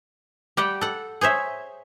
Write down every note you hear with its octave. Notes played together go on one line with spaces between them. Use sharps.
G3 G4 F#5 G5
A4 F#5
G#4 C5 C#5 E5